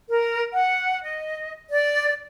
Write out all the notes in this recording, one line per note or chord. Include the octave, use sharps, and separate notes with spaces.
A#4
F#5
D#5
D5